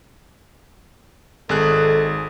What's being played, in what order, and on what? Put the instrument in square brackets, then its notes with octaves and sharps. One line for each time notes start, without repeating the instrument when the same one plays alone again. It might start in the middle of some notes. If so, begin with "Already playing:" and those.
[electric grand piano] G#1 G#4 F#6 [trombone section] D#4 A4